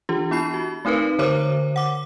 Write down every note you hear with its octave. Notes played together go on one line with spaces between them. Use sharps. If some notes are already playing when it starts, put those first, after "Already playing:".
E3 D4 F4 G4
B3 E4 B5 C7
F#4
A3 C4 D#4 A#4 B4
D3 A#4 C5 C#5 D6
F#5 D6